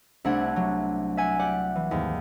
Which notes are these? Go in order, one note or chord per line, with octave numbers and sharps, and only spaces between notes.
C2 A3 D4 F#5 G#6
F#3
E5 F#5 G#5
G4 D5 F#5
E3
D#2 G#2